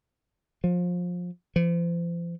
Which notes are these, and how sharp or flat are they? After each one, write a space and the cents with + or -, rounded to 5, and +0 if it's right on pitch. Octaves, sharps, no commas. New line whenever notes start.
F3 +25
F3 -40